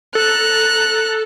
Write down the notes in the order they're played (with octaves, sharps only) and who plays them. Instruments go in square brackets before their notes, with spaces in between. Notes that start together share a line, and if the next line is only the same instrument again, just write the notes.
[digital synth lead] A4 [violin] A#5 F#6